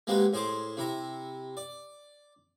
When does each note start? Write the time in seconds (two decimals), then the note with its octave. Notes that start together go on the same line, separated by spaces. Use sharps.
0.07 G#3 A#3 C4 F#4 G4 B4
0.33 A2 G#4 C5 C6 D6
0.77 C3 E4 A#5
1.57 D5